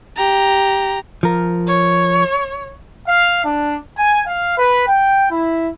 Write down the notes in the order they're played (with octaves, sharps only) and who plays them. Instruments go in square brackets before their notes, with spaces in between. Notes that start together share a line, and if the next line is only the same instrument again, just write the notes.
[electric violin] G4 A#5
[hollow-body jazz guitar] F3 A#4
[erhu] C#5
[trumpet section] F5
D4
G#5
F5
B4
G5
E4